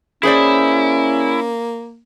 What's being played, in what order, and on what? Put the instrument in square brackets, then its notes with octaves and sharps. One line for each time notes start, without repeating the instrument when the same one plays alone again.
[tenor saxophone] A#3 [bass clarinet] C#4 [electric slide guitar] E4 [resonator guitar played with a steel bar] G#4 C5 D5